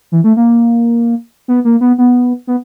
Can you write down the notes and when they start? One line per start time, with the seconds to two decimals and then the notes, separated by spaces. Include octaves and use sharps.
0.12 E3
0.24 A3
0.37 A#3
1.48 B3
1.65 A#3
1.81 B3
1.98 B3
2.47 B3